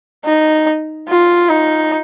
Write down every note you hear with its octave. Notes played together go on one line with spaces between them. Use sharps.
D#4
F4
D#4